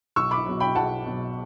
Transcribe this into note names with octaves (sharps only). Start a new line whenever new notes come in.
B1 C#6 E6
B5 D6
B2 F#3
G5 B5
B1 F#5 A5
B2 F#3